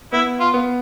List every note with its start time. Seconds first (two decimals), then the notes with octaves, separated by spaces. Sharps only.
0.12 B3 E4
0.40 F4
0.54 B3